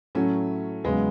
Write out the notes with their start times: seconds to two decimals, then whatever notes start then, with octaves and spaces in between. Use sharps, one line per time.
0.15 A2 F#3 A3 C#4
0.84 E2 C#3 F#3 G#3 B3